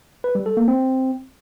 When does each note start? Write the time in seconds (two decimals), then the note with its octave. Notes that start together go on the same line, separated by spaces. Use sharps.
0.24 B4
0.35 G3
0.46 A4
0.57 A#3
0.68 C4